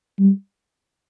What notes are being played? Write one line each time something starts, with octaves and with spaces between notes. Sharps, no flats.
G3